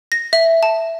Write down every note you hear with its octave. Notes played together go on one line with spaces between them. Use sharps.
A#6
E5
A5